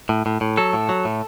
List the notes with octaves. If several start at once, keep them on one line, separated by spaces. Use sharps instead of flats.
A2
A2
A2
F#3 A4
A2
F#3
A2